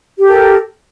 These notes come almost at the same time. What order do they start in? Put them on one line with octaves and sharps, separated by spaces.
G4 A4 A#4